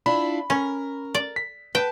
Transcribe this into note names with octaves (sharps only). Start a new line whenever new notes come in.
D4 E4 F4 B5
C#4 A#4
D5
B6
B4 G5 A5